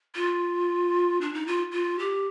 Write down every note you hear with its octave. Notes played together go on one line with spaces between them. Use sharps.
F4
D4
D#4
F4
F4
G4